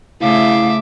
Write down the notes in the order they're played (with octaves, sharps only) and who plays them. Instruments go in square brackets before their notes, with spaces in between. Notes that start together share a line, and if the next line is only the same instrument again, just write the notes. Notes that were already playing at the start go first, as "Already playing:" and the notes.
[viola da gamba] C#3 A3 [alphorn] E4 [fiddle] E5 D6 [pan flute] F5